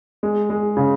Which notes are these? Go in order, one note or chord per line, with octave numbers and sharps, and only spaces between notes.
G#3
G#3
C#3